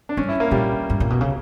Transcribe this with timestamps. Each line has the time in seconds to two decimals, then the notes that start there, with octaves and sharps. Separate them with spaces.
0.09 D4
0.17 G2 C#4
0.28 E4
0.40 A#3
0.51 A#2 G3
0.90 G2
1.00 A#2
1.10 B2
1.21 C#3